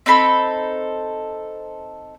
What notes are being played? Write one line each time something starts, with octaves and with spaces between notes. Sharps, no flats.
C4 D#4 A4 B5